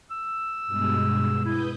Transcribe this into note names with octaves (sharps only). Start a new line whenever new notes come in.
E6
G2 B2 G#3
E4 B4 D#6 G6